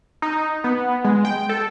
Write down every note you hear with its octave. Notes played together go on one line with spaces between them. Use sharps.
D#4
B3
G#3
G5
A4